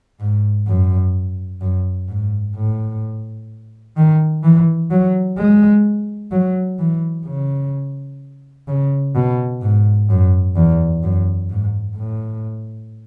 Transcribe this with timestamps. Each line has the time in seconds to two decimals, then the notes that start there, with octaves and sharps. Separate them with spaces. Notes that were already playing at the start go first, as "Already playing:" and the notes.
0.20 G#2
0.68 F#2
1.61 F#2
2.08 G#2
2.56 A2
3.97 D#3
4.44 E3
4.91 F#3
5.38 G#3
6.32 F#3
6.79 E3
7.26 C#3
8.68 C#3
9.15 B2
9.62 G#2
10.09 F#2
10.56 E2
11.03 F#2
11.50 G#2
11.97 A2